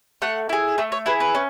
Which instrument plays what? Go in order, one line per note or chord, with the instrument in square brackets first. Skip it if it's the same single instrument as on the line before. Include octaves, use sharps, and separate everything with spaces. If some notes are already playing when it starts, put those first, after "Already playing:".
[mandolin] A3 F#5
E4 G#4
A3 E5
C#5
E4 G#4 B4
B4
C#4